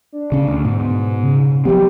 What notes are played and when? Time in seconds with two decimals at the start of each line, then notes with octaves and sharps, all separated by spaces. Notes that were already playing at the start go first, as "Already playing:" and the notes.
0.12 D4
0.32 C#3 C#4
0.47 D2
0.65 G#2 B2
1.23 C#3
1.65 F3 F#3 B3 G4